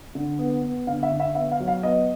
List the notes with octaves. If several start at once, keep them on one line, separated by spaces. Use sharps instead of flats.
D3
B3
B3
D3 F5
E5
D3
E5
B3 E5
F5
F#3
F5
B3 D#5